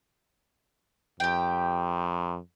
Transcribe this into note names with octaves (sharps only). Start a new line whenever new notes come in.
F2 G4 G5